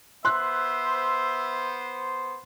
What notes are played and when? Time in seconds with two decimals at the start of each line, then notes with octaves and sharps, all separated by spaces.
0.25 B3 C5 E5 C6 F#6